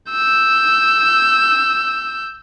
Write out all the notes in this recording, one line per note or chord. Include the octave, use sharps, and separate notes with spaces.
E6 G6